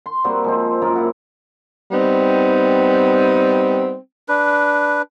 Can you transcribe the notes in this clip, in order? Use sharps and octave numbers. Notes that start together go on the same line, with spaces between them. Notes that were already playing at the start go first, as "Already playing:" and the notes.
C6
G3 A#3 C4 F#4
F3 G#3 C4
F#2 A#3 F4 A#4
E4 F#5
G3 B3 C4 D#4
D4 B4